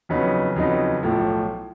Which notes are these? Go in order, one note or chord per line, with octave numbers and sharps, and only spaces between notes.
F2 C#3 F#3 B3 D#4
F2 C#3 F#3 B3 D#4
B1 A2 F3